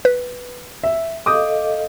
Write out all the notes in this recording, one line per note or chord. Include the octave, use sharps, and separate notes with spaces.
B4
E5
A4 D#5 F5 D6 D#6 G6